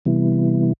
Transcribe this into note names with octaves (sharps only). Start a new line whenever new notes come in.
C3 E3 G3 B3 E4